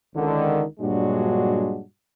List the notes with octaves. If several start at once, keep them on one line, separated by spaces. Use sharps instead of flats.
C#2 D3 D#3
G2 A#2 F#3 G#3 D4 F#4